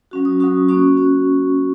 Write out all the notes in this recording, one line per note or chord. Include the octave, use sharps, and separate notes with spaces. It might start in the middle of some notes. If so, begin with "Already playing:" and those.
F#3 C#4 F#4
D#6
F#3 C#4 F#4 C#6
A#3 C#4 F#4 C#6
C#4 F#4